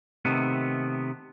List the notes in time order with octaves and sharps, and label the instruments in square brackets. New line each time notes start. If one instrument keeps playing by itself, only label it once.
[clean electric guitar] C3 D#3 A3 B3